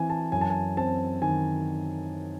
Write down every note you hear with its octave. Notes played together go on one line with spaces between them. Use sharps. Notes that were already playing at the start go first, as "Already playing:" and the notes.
Already playing: E3 C4 G#5
A5
F#2 G#5
A5
G#5
C4 A5
D#3 G#5